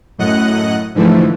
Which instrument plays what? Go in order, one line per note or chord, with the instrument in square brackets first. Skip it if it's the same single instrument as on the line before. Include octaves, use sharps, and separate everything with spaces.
[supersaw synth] F#2 A2 D#5 F#5 F#6
G#2 D3 E3 F3 A3